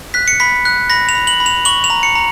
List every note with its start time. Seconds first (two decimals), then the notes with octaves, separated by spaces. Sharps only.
0.14 F#6 B6
0.28 C#7
0.40 B5 B6
0.65 F#6
0.90 B5 A#6
1.09 F7
1.15 B5
1.27 F#7
1.40 B5
1.46 F7
1.65 C#6 F#7
1.84 F7
1.90 A#5
2.03 C#7
2.15 A#5